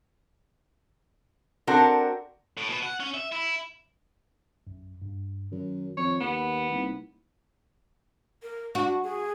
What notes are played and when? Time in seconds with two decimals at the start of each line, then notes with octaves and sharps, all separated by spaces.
1.67 C4 D4 F#4 A4 A#4
2.57 A2
2.70 B2
2.83 F#5
3.00 C#4
3.14 E5
3.32 E4
4.67 A#1 F#2
5.02 G2
5.52 F#2 D#3
5.97 F2 C#5
6.20 D#2 B3
6.71 C2 A#3 D#4 E4
8.43 A#4
8.75 D4 F#4
9.03 G#4